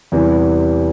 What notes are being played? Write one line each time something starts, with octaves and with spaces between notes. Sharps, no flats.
E2 C3 E3 G3